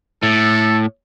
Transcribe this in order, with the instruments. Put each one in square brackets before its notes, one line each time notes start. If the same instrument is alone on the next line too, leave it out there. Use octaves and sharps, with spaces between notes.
[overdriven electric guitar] A2 [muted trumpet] A4